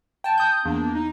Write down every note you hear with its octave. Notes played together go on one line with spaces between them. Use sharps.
G5 A5
D#6 G6
E2 A#3 D4
D#4